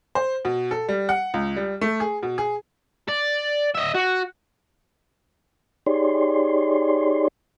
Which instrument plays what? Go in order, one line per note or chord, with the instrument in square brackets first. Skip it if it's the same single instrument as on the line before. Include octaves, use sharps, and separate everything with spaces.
[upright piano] C5
B2
A4
G3
F#5
C#2
G3
A3
G#4
B2
G#4
[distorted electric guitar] D5
D#5 E5
F#4
[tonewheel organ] D#4 G4 G#4 C#5 D5 C6